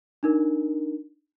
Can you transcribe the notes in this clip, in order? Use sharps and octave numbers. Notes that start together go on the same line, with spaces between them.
D4 D#4 A#4